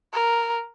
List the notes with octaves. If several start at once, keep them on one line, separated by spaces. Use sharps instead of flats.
A#4